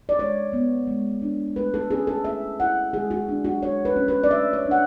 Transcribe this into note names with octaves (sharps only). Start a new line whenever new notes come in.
D5
G#3 C#5
B3
G#3
D4
A3 B4
A4
C#4 G#4
A4
A3 E5
E4 F#5
G#3 G#4
F#4
D4
F#4
G#3 C#5
B4
C#4
B4
D5
A3 E5
C#5
D4
F#5